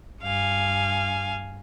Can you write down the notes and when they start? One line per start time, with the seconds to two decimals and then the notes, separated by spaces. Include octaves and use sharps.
0.22 G2 F5 G#5